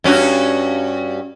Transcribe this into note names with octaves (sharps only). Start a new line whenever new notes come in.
G2 C#4 F#4